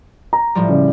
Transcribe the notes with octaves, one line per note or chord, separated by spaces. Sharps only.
A#5
A2 F3 G3
C#3